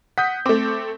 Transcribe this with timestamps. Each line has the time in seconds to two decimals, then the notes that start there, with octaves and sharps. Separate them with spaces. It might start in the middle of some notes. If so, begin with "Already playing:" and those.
0.18 F#5 D#6 G6 B6
0.46 A3 C4 D6